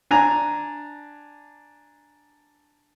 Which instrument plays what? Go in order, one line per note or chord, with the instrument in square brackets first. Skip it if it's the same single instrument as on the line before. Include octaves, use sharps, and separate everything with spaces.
[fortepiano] D4 G#5 A#5